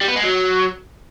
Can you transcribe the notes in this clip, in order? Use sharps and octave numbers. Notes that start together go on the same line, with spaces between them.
G3
B3
G#3
F#3